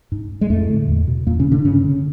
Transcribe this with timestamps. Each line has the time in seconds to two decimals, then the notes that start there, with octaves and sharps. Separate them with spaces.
0.12 G#2
0.41 G#3
0.50 F2 A2 A3
0.69 D3
0.88 E2
1.07 B2
1.26 E2 A#2 A#3
1.39 C#3 C#4
1.45 B2
1.52 D3 D4
1.64 G2 C#3 C#4
1.84 D3